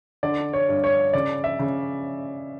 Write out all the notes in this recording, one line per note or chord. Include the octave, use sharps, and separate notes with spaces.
D3 D5
C#5
G2
C#5
C#3 D5
E5
C#3